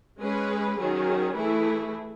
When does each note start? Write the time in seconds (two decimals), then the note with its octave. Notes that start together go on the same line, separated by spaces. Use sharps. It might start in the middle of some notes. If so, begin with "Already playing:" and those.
0.19 G#3 C#4 G#4 B4
0.76 D#3 F#3 C#4 G#4
1.35 E3 A3 E4 G#4